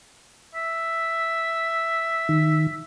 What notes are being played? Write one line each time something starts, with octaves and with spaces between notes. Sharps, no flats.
E5
D#3